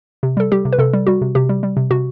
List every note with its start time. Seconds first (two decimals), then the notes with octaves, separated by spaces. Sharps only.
0.23 C3
0.37 G3 A4
0.52 G3 G4
0.65 C3
0.73 B4
0.79 C3 A4
0.93 G3
1.07 G3 F#4
1.22 C3
1.35 C3 G4
1.49 G3
1.63 G3
1.77 C3
1.91 C3 F#4